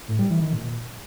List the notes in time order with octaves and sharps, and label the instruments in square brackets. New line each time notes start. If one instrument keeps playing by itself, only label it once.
[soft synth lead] A2
G3
E3
D#3
A#2